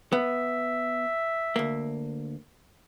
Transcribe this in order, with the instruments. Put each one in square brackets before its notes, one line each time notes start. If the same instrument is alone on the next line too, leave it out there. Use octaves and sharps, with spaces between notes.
[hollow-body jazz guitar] B3 [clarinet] E5
[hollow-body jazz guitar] D2 A#3